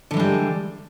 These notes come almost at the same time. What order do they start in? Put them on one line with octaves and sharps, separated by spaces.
D3 E3 G#3 G3